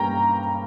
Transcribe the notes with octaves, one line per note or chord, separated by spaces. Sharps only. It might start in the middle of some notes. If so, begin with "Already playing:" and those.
Already playing: G2 G3 A#3 C#4 G5 A#5